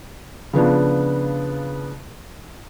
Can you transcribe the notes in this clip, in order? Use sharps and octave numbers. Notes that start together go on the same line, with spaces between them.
C#3 F3 B3 D4